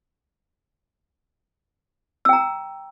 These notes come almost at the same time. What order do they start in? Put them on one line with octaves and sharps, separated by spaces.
E6 G5 A#5